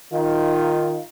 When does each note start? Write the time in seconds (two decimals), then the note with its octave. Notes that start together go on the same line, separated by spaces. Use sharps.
0.13 D#3 D#4 F4